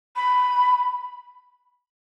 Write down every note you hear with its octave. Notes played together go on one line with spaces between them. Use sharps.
B5